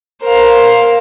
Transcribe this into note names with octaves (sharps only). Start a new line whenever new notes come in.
A#4 C5 F5